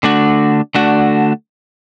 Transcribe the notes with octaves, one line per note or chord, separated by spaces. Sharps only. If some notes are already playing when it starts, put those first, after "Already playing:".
D3 A3 D4 F#4
D3 A3 D4 F#4